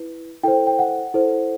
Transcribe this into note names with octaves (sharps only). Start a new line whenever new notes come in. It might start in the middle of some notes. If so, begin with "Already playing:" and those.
Already playing: E4 B4
E4 A4 C5 G5
G5
F#5
E4 A4 C5